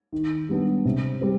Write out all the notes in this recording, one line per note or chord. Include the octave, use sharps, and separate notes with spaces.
D#3
G3 B3 D4
C3
G3 C4